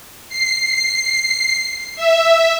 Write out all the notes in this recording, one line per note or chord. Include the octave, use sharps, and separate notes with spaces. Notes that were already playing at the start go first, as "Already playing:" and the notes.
C7
E5